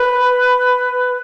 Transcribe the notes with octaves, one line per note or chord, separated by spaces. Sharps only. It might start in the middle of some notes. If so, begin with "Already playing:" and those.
Already playing: B4